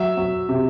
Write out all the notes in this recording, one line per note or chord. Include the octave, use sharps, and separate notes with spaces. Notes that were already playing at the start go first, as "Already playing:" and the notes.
Already playing: F#3 E5
F#3
C3